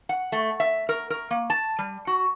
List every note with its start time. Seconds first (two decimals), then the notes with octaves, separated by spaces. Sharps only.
0.09 F#5
0.32 A3
0.60 E5
0.89 A#4
1.10 A#4
1.31 A#3
1.50 A5
1.79 G3
2.07 F#4